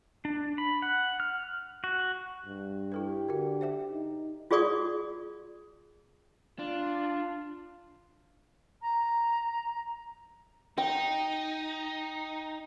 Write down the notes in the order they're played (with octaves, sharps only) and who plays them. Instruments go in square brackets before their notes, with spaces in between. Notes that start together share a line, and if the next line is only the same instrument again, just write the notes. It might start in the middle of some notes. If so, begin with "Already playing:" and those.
[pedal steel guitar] D4
B5
F#5
F6
F#4
[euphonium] G2
[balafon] E4 A4 B4 [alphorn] G4
[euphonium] D3 [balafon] F#4 A#4
[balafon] C5 E5 G5
[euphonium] D#4
[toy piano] F4 F#4 G#4 D5 C#6 D#6
[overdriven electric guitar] D4 [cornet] F4
[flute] A#5
[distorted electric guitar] D#4 [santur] G5